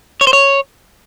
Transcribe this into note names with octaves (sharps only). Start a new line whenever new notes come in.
C#5
C5
C#5